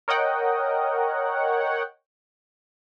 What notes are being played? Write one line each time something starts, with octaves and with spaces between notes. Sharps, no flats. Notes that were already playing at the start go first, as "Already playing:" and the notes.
A#4 C#5 D#5 F#5 G5